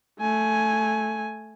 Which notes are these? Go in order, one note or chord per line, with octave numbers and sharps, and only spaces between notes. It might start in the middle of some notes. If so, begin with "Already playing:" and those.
A3 G#5